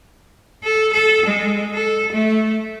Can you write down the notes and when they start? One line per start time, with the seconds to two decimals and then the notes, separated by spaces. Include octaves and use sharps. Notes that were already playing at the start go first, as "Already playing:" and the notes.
0.64 A4
0.93 A4
1.26 G#3
1.74 A4
2.12 A3